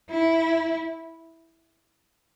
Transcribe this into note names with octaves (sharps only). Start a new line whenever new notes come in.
E4